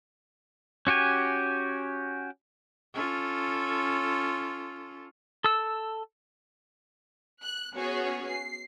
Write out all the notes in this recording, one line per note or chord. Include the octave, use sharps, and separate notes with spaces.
C#4 F#4 G4 G#5
C#4 F4 A4
A4 E6
F#6
B3 C#4 F#4 G#4 C#5
C7